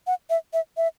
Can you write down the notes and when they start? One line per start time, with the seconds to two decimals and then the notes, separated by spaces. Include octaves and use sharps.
0.07 F#5
0.30 E5
0.53 E5
0.77 E5